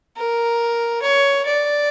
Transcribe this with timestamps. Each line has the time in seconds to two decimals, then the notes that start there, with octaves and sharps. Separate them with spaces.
0.17 A#4
1.03 C#5
1.46 D5